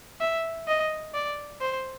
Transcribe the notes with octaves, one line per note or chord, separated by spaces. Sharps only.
E5
D#5
D5
C5